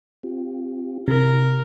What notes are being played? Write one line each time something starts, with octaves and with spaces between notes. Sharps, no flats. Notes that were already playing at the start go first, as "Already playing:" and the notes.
C4 F4 G4
C3 E4 G4 A#4